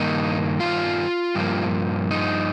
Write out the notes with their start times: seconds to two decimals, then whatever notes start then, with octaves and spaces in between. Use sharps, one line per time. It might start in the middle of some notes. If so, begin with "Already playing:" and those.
Already playing: G2 D#3 A#3 D#4
0.60 F4
1.35 G2 F3 A#3
2.11 D#4